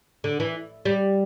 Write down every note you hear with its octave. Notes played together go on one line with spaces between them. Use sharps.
D3
E3
G3